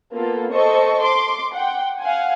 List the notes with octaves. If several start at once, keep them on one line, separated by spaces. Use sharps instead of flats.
A#3 B3 F4 A4
A4 C5 D#5 C#6
C6 D6
F#5 G5
F5 F#5 G#5